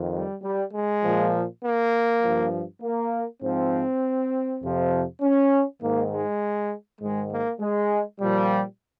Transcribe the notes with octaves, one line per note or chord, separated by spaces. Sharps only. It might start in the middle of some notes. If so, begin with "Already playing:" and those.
Already playing: F2 D#3
G3
G3
G#3
A#2 F3
A#3
G2 F3
A#3
G#2 F3 C4
F2 C3 F3
C#4
G#2 D#3 A#3
G#3
G#2 D#3 G#3
A#3
G#3
A#2 F3 G3